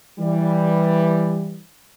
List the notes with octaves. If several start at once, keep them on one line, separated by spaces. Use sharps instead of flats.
E3 G3